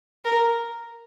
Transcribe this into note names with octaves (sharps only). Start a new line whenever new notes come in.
A#4